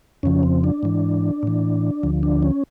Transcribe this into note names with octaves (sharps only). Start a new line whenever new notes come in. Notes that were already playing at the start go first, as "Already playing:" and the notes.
F2 C#3 F3 C#4
C4
D4
G#2 E3
A2 E3
D2 D3 F3
D4
C#4